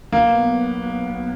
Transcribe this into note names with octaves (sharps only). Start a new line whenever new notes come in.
B1 B2 F#3 A#3 B3